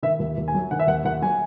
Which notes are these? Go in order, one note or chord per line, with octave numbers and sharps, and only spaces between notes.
D#3 E5
D#2
D#2
G#5
F#3
D#3 F#5
E5
D#2 F#5
D#2 F#5
F#3 G#5